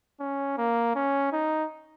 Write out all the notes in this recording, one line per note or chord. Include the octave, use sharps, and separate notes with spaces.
C#4
A#3
C#4
D#4